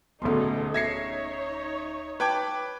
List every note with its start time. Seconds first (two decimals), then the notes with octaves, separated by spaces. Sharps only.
0.22 D1 D2 B2 C#4 D#4 G#4 A4 C6
0.74 D#4 C#5 E5 G#6 A#6 C7 C#7
2.20 B4 G5 A5 D6 G#6